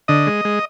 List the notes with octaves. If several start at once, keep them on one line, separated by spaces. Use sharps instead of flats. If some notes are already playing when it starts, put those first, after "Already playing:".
D3 D#5
G#3
G#3